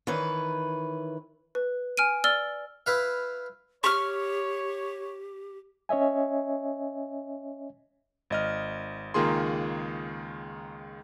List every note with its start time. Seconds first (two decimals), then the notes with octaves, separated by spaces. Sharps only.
0.07 D#3 E3 B4 C#5
1.55 B4
1.97 G#5 F6 D7 D#7
2.24 D5 E6 F6 A6 G7
2.86 E4 B4 F5
3.84 G4 C#5 C#6 F6
5.89 C#4 C#5 D#5 E5 G#5
8.30 G#1 D#5 F6
9.14 C#2 D#3 A#3 F4 G#4 C6